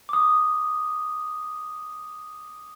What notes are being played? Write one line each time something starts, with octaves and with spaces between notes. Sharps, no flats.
D6 D#6